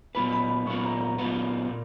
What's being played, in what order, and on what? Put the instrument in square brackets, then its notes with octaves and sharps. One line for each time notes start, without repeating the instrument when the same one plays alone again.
[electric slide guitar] A#2 F#3 B3 F4 B4 [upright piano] B5
[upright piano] B5
B5
[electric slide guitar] A#2 F#3 B3 F4 B4 [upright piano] C#6
[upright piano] A#5
A#5
[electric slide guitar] A#2 F#3 B3 F4 B4
A#2